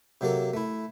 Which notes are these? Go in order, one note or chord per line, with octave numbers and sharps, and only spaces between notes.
C3 F#3 A#3 A4
A3 E4